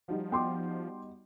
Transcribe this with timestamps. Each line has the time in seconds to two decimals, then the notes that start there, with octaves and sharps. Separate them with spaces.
0.08 F3 G3 D#4 F#4
0.32 B3 G5 C6 D6